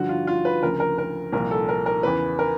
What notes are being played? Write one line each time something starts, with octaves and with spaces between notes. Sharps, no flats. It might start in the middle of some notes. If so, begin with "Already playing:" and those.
Already playing: G2 D3 F3 F#4
F4
F4
B4
D2 C#3 F3 A#4
A#4
A#4
C2 A#2 F3 A#4
A4
A#4
A#4
E2 C#3 E3 B4
A#4